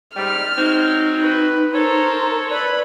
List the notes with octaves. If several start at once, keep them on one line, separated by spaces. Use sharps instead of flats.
G#2 G3 F6
F#3 G#3 C4 D#4
B4
A4 A#4 C5 C#5
B4 D5 B5